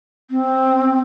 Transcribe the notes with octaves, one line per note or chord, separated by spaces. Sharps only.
C4